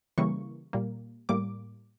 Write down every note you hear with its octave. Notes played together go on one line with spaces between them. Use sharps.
C#3 E3 G3 A#3 C#6
A#2 G3 A#3
A2 G3 A#3 D6